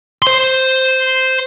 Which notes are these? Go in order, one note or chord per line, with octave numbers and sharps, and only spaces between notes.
C5 C6